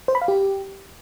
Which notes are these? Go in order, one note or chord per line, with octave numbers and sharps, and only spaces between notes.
C5
B5
F5
G4